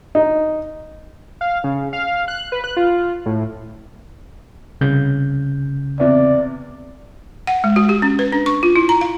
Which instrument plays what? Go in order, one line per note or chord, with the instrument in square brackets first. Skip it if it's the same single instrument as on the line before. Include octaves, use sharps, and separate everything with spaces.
[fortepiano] D#4
[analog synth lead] F5
C#3
F5
F#6
B4
F#6
F4
A2
[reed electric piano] C2 C#3 G6
[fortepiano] E2 C3 [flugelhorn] D5
[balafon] F#5
G#3
F#4
G4
C#4
B4
D4
C#6
F4
E4
A#5
F5